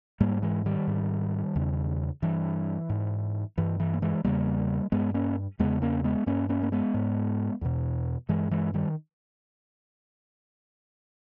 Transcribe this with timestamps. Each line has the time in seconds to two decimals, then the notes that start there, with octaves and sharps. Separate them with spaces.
0.20 G#2 G3 A#3
0.42 E3 G#3
0.66 D#3 G3
0.87 G#2
1.55 E2 C#3
2.22 G2 E3
2.89 G#2
3.58 G2 E3
3.80 E3
3.94 A#3
4.02 E3 G#3
4.24 E2 C#3 G3 A#3
4.92 G2 G#3 B3
5.14 A#3 C#4
5.59 E2 C#3 G#3 B3
5.82 A#3 C#4
6.04 G#3 B3
6.26 G2 A#3 C#4
6.49 A#3 C#4
6.63 A#3
6.72 G#3 B3
6.94 G#2
7.61 E2 B2
8.29 G2 E3 G#3
8.51 E3 G#3
8.74 D#3 G3